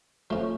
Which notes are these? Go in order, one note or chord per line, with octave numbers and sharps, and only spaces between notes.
F3 A3 C#4